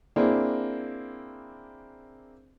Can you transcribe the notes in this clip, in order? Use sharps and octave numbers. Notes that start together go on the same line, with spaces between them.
A#3 C4 D4 E4 G#4